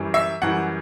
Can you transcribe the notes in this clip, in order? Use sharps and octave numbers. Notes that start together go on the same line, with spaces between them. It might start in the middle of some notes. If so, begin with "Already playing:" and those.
Already playing: F#2 E3 G3
E5
F#2 E3 G3 F#5